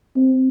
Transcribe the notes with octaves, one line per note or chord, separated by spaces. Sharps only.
C4